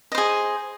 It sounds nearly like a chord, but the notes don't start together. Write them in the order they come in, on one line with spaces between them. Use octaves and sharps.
D#5 C5 G#4